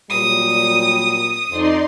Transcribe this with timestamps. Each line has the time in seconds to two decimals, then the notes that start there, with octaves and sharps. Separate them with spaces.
0.10 A#2 F#3 G3 D#6
1.50 F2 D#4 D5 C6